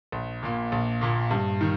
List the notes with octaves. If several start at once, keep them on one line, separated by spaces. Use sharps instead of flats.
A#1
A#2 A#3
A#1
A#2 A#3
G2
D#3